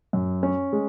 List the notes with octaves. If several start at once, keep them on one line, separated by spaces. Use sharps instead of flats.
F#2
C#4
G#3